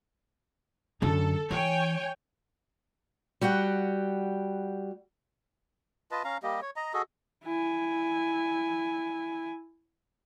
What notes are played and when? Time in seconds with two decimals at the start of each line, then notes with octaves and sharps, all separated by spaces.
1.02 F#2 D3 A4
1.51 E3 C#5 G5 G#5
3.41 G3 F#4 F#5 G5
6.11 F4 B4 D#5 A5
6.24 C#4 F5 A#5
6.43 G3 A#3 G4 D#5
6.62 C#5
6.76 D#5 A#5
6.93 F#4 G#4 A4 D#5
7.45 E4 G#5